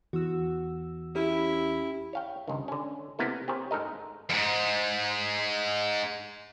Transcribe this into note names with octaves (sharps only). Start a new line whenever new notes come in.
E2 F#4 E6
C#4 E4 G4
C#5 F5 G5
C#2 G2 D#3
D3 C#4
C3 A#3 B3 E4 A4
C4 G4 G#4 A#4 C5 C#5
G#2 D#4 A4 A#4 D#5
F2 G#2